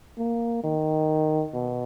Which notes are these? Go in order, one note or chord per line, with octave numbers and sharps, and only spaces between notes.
A#3
D#3
B2